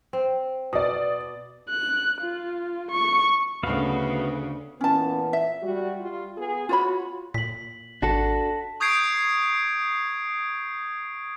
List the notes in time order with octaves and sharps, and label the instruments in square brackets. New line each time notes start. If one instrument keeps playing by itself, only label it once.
[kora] C4
[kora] B2 [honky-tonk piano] D5 D#6
[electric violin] F#6
F4
C#6
[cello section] D2 C#3 [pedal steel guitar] B3 F#4 F5
[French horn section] A#2 E3 B3 [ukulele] C#4 A5
[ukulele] E5
[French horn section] G3 F#4
G3 F4
B3 G#4
[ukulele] F4 C#5 B5 [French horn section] F#4
[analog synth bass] A#2 [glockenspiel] B6 F#7
[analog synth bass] G#1 [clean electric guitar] D4 F#4 A4 [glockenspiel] A5 A#6
[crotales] C#6 D#6 G6 G#6 C7 D7